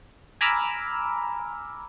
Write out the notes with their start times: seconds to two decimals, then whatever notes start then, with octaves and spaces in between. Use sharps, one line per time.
0.41 G#5 A#5 B5 D6 E6 F6